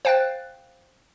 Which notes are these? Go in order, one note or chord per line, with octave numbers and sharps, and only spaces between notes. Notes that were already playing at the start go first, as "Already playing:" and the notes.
C5 F5 G5 F#6 A6